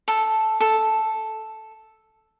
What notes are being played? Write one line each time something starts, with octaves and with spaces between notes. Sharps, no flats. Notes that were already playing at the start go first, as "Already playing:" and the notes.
A4
A4